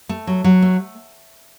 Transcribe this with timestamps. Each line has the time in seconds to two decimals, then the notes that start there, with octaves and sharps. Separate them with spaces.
0.09 A3
0.27 F#3
0.44 F#3
0.62 A3